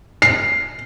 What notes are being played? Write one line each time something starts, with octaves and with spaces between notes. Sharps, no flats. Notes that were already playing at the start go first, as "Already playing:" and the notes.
C7